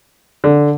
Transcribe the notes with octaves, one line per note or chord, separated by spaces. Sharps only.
D3